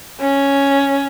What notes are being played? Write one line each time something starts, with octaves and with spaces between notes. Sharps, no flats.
C#4